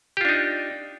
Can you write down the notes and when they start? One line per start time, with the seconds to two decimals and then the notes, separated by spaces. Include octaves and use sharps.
0.17 G4
0.21 F4
0.25 D4
0.29 D#4